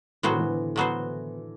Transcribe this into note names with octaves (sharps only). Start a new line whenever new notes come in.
A2 E3 F#3 B3 F#4 C5
D3
E3
A2 F#3 B3 F#4 C5